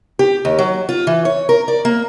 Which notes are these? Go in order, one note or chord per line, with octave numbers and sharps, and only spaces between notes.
G4
D#2
F#3
F4
E3
C#5
A#4
D5
A#3